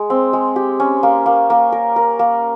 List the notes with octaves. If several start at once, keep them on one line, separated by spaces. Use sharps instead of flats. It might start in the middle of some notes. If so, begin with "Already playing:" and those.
Already playing: G#3
C4
G#3
G4
C#4
A#3
A#3
A#3
A#4
A#4
A#3